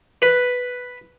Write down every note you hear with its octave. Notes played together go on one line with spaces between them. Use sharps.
B4